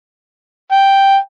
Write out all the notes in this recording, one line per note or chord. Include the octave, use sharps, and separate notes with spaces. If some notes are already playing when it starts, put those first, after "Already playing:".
G5